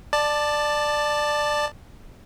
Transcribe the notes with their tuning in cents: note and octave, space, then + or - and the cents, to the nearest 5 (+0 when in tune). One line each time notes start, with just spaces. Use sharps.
D5 +15 A5 +0